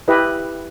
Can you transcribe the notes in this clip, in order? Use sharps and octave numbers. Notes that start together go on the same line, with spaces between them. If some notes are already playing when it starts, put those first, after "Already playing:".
E4 G4 B4 D#5